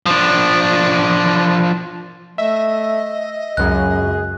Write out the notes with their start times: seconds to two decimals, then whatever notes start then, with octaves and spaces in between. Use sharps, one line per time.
0.06 F3 D4
2.38 A3 D#5 E5
3.57 C#2 F#2 C#3 G#4 F#6